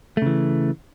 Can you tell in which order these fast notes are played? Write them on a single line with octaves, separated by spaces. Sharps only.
A3 C#3 E3